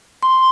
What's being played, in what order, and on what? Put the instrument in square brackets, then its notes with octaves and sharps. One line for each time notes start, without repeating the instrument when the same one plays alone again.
[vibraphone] C6